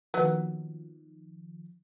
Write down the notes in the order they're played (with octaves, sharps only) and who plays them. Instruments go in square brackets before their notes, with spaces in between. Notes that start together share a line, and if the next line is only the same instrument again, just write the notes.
[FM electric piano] D#3 F3 [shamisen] F#3 A#3 B3